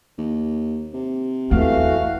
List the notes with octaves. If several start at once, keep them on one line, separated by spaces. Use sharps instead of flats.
D#2
C3
E2 E3 A3 F#4 F5